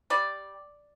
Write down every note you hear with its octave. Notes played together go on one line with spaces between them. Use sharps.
G3 D5